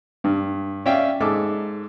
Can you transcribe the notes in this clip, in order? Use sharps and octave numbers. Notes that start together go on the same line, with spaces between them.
G2
C#4 D5 E5 F5 G5
G#2 A4 D6